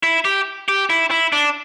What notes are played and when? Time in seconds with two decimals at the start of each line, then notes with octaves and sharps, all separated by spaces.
0.03 E4
0.25 G4
0.68 G4
0.90 E4
1.11 E4
1.33 D4